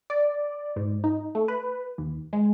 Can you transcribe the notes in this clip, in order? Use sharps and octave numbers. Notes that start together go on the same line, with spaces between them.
D5
G#2
D#4
A3
B4
D#2
G#3